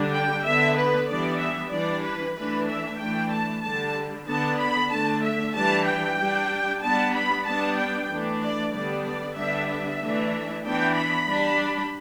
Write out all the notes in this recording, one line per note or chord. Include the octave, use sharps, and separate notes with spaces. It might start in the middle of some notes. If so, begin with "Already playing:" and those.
Already playing: D3 G3 D4
G5
D3 B3 D4 E5
B4
E3 G3 B3 D4 D5
E5
E3 G3 D4 D5
B4
E3 A3 D4 B4
E5
E3 A3 D4 G5
A5
D3 G3 D4 A5
D3 B3 D4 A5
B5
D3 A3 D4 A5
E5
E3 G3 D4 A5
G5
G3 D4
G3 B3 D4 A5
B5
G3 B3 D4 A5
G5
E3 A3 D4
D5
D3 G3 B3 D4 D5
D5
D3 G3 B3 D4 E5
E5
E3 A3 D4
E3 B3 D4 G5
B5
G3 D4